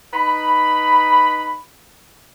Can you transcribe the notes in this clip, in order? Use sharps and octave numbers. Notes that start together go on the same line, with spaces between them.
D#4 B4 B5